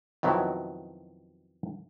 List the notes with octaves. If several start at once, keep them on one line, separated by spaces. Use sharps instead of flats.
F2 B2 D#3 F#3 E4